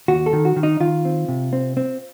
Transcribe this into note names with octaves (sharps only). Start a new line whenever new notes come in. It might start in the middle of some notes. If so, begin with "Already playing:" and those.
D#2 F#4
A4
D#3
F#4
D#3
D#4
D#3 F4
C4
C3
C4
C4